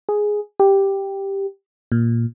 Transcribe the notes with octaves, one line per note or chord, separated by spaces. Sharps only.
G#4
G4
A#2